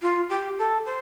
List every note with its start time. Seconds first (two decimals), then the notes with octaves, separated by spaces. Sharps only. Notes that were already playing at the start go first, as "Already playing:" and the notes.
0.02 F4
0.30 G4
0.59 A4
0.86 C5